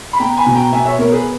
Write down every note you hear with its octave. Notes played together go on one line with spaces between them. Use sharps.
B5
B3 G5 A#5
G#5 B5
B2
G5 A#5
B3 E5 G#5
C#5 E5
B3 A#4 C#5
G#4 B4